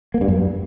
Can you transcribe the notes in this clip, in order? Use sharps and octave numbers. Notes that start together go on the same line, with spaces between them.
A#3
G2
F#2